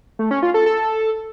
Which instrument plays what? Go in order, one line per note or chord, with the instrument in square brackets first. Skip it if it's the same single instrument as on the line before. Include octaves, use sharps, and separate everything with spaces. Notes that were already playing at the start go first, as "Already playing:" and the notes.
[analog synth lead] A3
C#4
F4
A4
A4